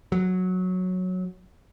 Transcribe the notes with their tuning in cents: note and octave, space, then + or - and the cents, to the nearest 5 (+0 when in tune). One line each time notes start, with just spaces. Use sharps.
F#3 -10